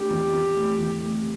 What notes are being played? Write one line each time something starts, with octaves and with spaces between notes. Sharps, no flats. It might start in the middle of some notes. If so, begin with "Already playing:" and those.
Already playing: A3 D4 G4
E2
E2
A3
E2
A3